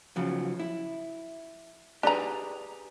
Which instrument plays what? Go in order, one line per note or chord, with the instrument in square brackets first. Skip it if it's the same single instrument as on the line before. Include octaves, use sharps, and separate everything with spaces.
[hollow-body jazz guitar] C#3 F3 F#3
E4
[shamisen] D4 A#5 [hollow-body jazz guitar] G4 G#4 B4